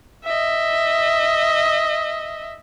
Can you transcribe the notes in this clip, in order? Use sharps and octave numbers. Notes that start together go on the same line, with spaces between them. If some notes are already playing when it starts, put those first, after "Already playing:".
D#5 E5